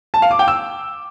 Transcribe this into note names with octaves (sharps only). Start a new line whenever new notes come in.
A5
F5
D6
G5
E6